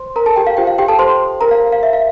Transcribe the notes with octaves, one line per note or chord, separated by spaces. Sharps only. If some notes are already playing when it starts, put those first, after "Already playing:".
Already playing: C5 C6
A#4 A#5
A4 A5
G4 G5
F5
F4 G4 C5 G5
F5
G4 G5
A4 A5
C5 C6
A#4 A#5
F5
F5
E5
F5